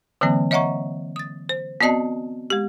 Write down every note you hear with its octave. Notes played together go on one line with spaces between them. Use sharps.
D3 E3 F#3 A#3 C4
C#5 D#5 E5 F#5 A#5 C#6
D#6 A6
C5
B3 C4 F#4 D5 D#5 A5
G#3 G4